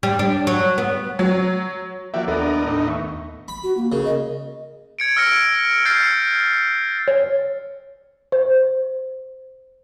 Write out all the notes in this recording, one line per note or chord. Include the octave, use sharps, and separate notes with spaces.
G3
D4
F#3
B3
F#3
F3 A#3 F#4 D5 E5 G5
D#2 B3 D4 A4 A#4 D5 D#5
A2 D#3 D#4
E5 C#6
B5
F#4
A#3
C#3 A#4
D#5
G#6 C#7 D7
E6 F6 A#6 C#7 D7
F6 G6 A6 C7 C#7
C#5
C5